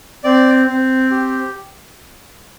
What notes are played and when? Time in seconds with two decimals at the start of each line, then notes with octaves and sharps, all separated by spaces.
0.24 C4 D5
0.67 C4
1.11 G4